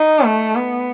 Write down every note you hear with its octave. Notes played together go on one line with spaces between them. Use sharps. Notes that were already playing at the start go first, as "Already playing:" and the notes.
Already playing: D#4
A3
B3